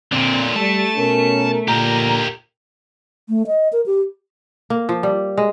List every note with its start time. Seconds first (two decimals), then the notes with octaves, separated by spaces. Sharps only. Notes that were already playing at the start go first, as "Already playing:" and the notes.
0.12 A#2 D3 C4
0.56 G3 A3 A5
0.96 B2 C#4 A#4
1.68 A#2 D3 G4 A#4 A#5
3.29 A3
3.47 D#5
3.73 A#4
3.86 G4
4.70 A#3
4.89 F3
5.03 G3
5.38 G#3